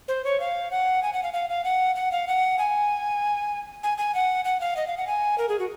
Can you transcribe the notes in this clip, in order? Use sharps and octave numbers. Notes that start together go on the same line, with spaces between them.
C5
C#5
F5
F#5
G#5
F#5
F5
F5
F5
F#5
F#5
F5
F#5
G#5
G#5
G#5
F#5
F#5
F5
D#5
F5
F#5
G#5
A#4
G#4
F#4